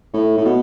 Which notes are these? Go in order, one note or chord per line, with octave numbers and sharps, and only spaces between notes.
A2
A2
B2